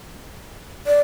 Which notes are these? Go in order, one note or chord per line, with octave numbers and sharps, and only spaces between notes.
D5